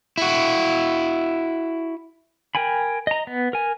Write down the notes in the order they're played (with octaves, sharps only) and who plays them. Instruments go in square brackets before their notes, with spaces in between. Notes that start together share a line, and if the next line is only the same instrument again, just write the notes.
[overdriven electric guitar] E4 F#4
[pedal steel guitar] A#4 G5 G#5 B5
D#5 A#5
B3
A#4 G#5